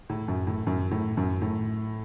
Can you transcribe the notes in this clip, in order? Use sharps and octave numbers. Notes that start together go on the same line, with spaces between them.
A2
F#2
A2
F#2
A2
F#2
A2